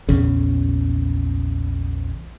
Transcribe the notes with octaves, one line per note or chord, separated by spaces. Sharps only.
A#1 E2 C#3